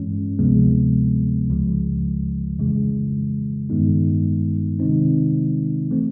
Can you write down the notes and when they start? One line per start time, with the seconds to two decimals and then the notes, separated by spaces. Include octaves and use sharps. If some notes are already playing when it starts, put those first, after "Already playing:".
Already playing: G2 E3 G#3 C#4
0.39 D2 C3 F3 G#3 B3
1.50 C#2 C#3 F3 G#3
2.59 F2 C#3 E3 G#3
3.70 G2 D#3 G#3 B3 D#4
4.80 C3 D#3 G#3 C4 D#4
5.91 E3 A3 C4